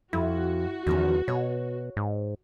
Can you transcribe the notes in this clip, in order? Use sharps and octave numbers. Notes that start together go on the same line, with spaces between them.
F2 E4 F#4
E2 D#3 F3 C#4
B2 C#5
G#2